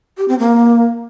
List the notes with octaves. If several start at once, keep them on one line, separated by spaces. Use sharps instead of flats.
G4
C4
A#3